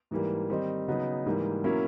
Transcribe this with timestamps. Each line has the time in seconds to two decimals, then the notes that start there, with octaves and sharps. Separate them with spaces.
0.11 G#2 E3 G3 A#3
0.49 D#3 G3 C4 D#4
0.88 C#3 F#3 B3 D#4
1.26 G#2 E3 G3 A#3
1.64 B2 F#3 A#3 C#4 E4